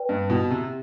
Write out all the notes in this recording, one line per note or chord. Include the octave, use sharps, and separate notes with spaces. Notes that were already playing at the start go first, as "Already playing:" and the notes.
Already playing: B4 D5 G5
G2
B2 E4
C3